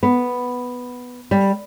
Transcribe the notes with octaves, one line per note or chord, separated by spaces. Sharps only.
B3
G3